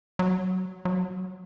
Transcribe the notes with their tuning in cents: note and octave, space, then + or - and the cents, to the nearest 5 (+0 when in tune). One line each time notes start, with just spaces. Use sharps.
F#3 +15
F#3 +5